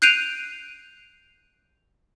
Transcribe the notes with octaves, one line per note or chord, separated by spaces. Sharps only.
F#6 G6 C7 D7 D#7 F7